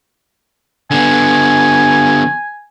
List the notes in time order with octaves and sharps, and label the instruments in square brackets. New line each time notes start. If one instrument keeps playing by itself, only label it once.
[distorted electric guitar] D3 B3 [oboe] G#5